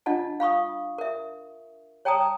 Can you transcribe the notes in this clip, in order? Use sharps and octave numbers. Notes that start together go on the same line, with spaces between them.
D4 F4 D#5 F#5 A5
F5 B5 C#6 D#6
A#4 E5
C#5 G5 A5 A#5 D#6